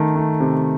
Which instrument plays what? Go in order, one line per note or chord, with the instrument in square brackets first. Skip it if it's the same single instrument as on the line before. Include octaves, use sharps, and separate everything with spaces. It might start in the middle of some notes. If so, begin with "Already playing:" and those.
Already playing: [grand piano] D#3 A3
A3
C3